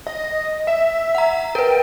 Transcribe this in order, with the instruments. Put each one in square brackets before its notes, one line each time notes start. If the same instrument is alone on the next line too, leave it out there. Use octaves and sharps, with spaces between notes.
[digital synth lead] D#5
E5
[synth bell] F#5 A#5
[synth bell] A#4 B4 [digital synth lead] G5